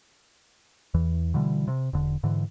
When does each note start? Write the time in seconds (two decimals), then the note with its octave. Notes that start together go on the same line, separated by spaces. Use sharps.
0.94 E2 E3
1.34 B2 D3 E3 G3
1.68 C3
1.93 E1 D3
2.23 G#2 D3 E3